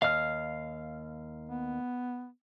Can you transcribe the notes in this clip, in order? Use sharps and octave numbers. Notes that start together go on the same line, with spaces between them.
D#2 D#5 F5 F6
B3